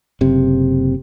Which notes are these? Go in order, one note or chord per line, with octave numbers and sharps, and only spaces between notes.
F#1 C3